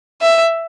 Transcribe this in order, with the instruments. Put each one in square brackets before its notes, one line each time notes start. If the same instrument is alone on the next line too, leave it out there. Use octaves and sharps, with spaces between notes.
[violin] E5